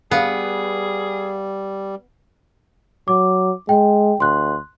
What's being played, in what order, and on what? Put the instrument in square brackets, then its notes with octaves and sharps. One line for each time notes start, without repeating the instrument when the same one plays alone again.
[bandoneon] G3 [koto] B3 [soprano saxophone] G#4 [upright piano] F5
[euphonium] F#3 [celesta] D6
[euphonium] G#3 [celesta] G5
[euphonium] D2 [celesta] C6 F#6